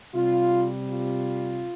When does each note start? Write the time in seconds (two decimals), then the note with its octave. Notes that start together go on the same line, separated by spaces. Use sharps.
0.14 C3 G3 F4
0.90 F4